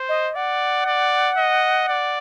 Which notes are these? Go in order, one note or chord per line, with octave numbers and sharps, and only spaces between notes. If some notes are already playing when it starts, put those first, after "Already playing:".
Already playing: C5
D#5
D5 F#5
D5
D#5
D5